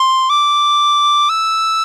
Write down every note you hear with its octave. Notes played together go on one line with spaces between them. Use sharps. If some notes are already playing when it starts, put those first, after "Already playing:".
Already playing: C6
D6
E6